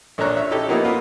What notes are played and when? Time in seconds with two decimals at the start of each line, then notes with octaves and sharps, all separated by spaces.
0.18 A#1 D4 A4 C#5 A#5 F#6
0.37 C#5 E5
0.50 C#4 D#4 E4 G4 A4
0.68 F3 A#3 B3 D#4 E4
0.84 A#3 F4 B4